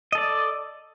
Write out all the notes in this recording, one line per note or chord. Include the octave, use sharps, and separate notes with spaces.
A4 D5 D#5